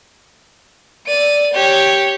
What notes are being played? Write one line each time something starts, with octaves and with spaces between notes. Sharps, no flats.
D5 D#7
G4 C#5